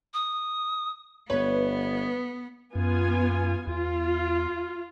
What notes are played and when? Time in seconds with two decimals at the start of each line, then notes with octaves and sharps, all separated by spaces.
0.14 D#6
1.30 G1 B3 B4 C#5
2.75 F#2 B3 F4 G#5
3.67 E2 F4